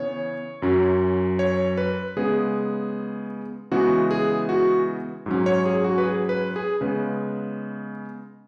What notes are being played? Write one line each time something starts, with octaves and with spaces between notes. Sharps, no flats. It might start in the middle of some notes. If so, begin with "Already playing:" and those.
Already playing: C#3 E3 B3 C#5
F#2 F#3 C#4
C#5
B4
C#3 G#3 B3 G#4
C#3 E3 G#3 B3 F#4
G#4
F#4
G#2 F#3 C#4
C#5
G#4
F#4
B4
G#4
B4
G#4
C#3 G#3 B3 B4